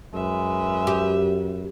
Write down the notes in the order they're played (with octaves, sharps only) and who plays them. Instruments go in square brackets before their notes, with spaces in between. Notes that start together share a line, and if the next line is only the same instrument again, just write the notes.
[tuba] F#2 [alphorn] G#3 [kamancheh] B4 E5
[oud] G4